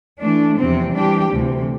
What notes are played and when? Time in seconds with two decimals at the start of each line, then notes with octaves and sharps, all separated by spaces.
0.21 E3 A3 D4
0.58 E2 C3 F3 C4
0.95 E3 G3 D4 G4
1.30 D2 C3 E3